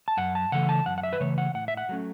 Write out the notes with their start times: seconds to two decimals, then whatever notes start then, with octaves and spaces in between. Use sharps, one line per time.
0.08 A5
0.17 F#2 F#5
0.35 A5
0.52 C#3 E3 A3 F#5
0.69 A5
0.86 F#2 F#5
0.98 F#5
1.03 E5
1.13 B4
1.20 C#3 E3 A3 C#5
1.38 F#5
1.54 A2 F#5
1.68 E5
1.77 F#5
1.89 F#3 A3 C#4